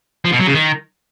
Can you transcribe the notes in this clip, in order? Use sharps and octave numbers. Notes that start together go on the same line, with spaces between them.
F3
B2
F#3
C#3
D#3